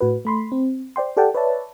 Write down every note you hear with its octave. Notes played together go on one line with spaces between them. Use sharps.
A2 F#4 B4
A3 B5 C6
C4
C5 D5 G5 C6
G4 A4 D5 F#5 G5 A5
B4 C#5 D5 E5 A5